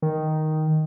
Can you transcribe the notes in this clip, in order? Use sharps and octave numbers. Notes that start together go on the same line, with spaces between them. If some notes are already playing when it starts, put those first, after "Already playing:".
D#3